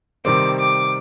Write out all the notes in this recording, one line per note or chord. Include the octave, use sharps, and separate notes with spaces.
C3 D#3 G3 C4 D6
D6